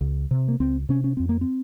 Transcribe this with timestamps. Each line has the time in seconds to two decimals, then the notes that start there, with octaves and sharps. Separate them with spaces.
0.01 C#2
0.31 C3
0.48 A#3
0.60 C#2 C4
0.89 C3 C#4
1.04 C#4
1.17 F2 C4
1.29 A#3
1.41 C4